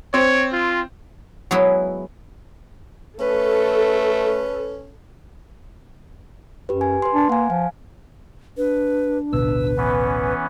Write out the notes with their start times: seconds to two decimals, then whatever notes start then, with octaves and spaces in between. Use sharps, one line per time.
0.14 C4 C#5
0.52 F4
1.51 F#3 G#3 B3 E4
3.20 A3 C#4 A4 B4
6.69 F#2 G4 B4
6.81 G#5
7.02 B4 C6
7.14 D4
7.29 A#3 F#5 G#5
7.50 F3 F5
8.57 D4 B4
9.33 A1 D2 B2 B4 E6
9.77 E3 B3 C#4